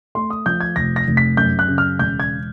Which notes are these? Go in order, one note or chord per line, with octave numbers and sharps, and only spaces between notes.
A3 C6
D#6
F3 G6
G#6
F1 A#6
A#6
F1
B6
F#2 G6
F#6
C#3
F6
E1 G6
G#6